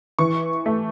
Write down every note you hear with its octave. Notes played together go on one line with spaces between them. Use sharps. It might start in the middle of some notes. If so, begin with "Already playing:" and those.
E3 C#6
A3